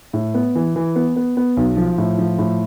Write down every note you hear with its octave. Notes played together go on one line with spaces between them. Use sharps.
A2
B3
E3
E3
B3
B3
B3
B1
F3
A2
F3
A2